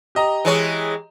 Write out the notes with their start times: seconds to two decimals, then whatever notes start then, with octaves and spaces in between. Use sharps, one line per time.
0.15 G4 D#5 A#5
0.45 E3 G#3 C#5